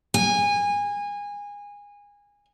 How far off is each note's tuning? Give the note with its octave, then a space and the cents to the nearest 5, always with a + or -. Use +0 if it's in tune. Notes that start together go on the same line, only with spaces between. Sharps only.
G#5 -25